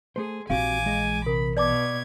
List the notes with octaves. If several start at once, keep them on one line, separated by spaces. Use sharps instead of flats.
A3 G#4 C5 C6
A#1 E3 C4 F#4 G4 F5 G#5 D6
G#3 G#4 D#5
C3 A#4 B5
B2 B4 D5 A5 D6 G#6